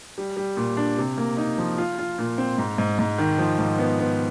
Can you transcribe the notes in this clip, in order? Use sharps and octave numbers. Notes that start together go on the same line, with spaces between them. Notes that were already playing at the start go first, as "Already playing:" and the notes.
G3
G3
A#2
D4
C3
A#3
D#4
F3
F4
F4
A#2
C4
G#2
G#2
G#2
D#3
F3
G#2
B3
B3